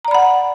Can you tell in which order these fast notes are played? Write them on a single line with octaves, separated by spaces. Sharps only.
A#5 D5 B5 F#5